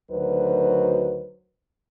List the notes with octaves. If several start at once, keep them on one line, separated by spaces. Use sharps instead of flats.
D2 D#3 F#3 B4 C5